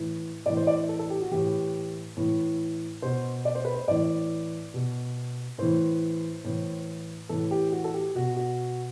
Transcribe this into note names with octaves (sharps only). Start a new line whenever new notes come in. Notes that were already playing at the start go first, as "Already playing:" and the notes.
Already playing: A2 E3
A2 E3 D5
C5
D5
A4
A4
G4
F#4
A2 E3 G4
A2 E3
B2 C5
D5
C5
B4
C5
A2 E3 D5
B2
A2 E3 C5
A2 E3
A2 E3 A4
G4
F#4
A4
G4
B2 F#4
F#4